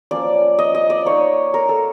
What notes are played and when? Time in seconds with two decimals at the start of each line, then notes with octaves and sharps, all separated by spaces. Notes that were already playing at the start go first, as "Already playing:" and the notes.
0.11 F3 A#3 C#4 D5
0.59 D#5
0.75 D#5
0.90 D5
1.06 A#3 D#4 C#5
1.54 A#4
1.69 A4